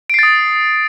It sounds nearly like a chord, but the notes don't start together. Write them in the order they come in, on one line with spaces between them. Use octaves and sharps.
D7 C7 A6 D#6